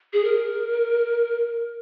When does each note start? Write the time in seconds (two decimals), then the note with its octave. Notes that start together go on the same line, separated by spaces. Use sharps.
0.13 G#4
0.24 A#4